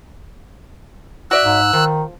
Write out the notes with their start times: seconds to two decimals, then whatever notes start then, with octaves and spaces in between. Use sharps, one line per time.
1.31 F#4 D5 E5 E6 F#6
1.45 G#2
1.73 D#3 F3